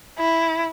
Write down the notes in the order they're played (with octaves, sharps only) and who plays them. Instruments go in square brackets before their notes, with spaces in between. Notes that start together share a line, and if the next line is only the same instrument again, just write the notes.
[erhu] E4